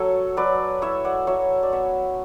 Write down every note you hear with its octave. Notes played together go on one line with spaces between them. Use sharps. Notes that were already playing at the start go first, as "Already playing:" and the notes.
Already playing: F#3 A4 C#5
F#3 B4 D5
E4 C#5 E5
D5 F#5
F#3 C#5 E5
D5
B3 C#5 E5